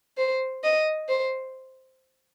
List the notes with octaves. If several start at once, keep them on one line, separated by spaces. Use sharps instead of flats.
C5
D#5
C5